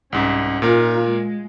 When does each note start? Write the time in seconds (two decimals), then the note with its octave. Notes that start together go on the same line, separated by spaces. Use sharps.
0.12 C2 G#2 C#4
0.62 A#2 D#4 F4 A#4
1.02 G#3